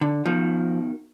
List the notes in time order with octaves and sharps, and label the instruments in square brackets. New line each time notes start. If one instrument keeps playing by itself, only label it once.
[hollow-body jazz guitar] D3
[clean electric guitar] B2 D#3 [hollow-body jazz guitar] F3